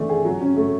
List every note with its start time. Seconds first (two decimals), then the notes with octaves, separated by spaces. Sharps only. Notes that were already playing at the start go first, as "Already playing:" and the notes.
Already playing: E3 A3 D4
0.09 G#4
0.25 F#3
0.41 C#4
0.57 A3